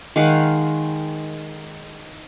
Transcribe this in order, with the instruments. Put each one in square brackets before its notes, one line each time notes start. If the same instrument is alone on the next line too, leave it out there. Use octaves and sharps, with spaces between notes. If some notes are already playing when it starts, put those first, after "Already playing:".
[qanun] D#3 G#3 F5 F#5